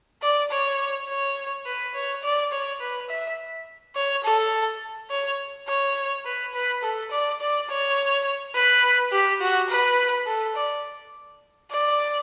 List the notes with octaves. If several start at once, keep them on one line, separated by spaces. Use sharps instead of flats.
D5
C#5
C#5
B4
C#5
D5
C#5
B4
E5
C#5
A4
C#5
C#5
B4
B4
A4
D5
D5
C#5
B4
G4
F#4
B4
A4
D5
D5